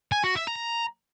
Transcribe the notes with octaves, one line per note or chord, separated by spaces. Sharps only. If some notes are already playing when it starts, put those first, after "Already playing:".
G#5
F#4
E5
A#5